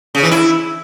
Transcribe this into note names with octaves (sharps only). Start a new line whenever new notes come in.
C#3
E3
E4